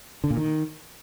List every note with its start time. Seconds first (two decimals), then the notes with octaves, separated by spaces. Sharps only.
0.24 D3
0.30 A#2
0.37 D#3